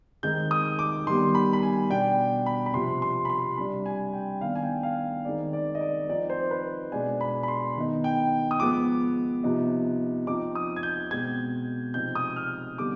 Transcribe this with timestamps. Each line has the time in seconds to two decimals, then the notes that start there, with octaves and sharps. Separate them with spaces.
0.23 D#3 G#3 C4 D#4 G6
0.51 D#6
0.79 D6
1.07 D#3 G3 B3 C6
1.35 B5
1.53 B5
1.63 G#5
1.90 B2 B3 D4 G5
2.46 B5
2.66 B5
2.74 C3 F3 C4 C6
3.02 C6
3.25 B5
3.30 C6
3.57 C3 G3 D4 B5
3.86 G#5
4.13 G5
4.41 D#3 B3 D4 F5
4.55 G#5
4.63 G5
4.83 F5
5.25 D#3 G#3 C4 D#4 D5
5.53 D5
5.75 D#5
5.81 D5
6.09 F3 C4 D#4 D5
6.30 C5
6.51 B4
6.92 B2 G#3 B3 D4 G#5
7.21 B5
7.43 B5
7.48 C6
7.77 D#3 B3 D#4
8.04 G5
8.51 D#6
8.60 F3 G#3 B3 D6
9.44 C3 F3 B3 D#4
10.27 F3 C4 D#4 D6
10.55 D#6
10.76 G#6
10.83 G6
11.11 B2 G#3 C4 G#6
11.94 C3 F3 G#3 C4 D#4 G6
12.15 D#6
12.36 F6
12.78 D3 G3 B3 D#4 D6